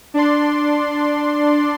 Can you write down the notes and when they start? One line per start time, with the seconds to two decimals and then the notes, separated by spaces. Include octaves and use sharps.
0.14 D4 D5 C6